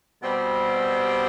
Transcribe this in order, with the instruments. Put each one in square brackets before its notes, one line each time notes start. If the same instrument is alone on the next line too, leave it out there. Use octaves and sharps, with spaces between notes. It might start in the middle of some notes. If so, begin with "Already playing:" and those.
[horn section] B2 G3 C4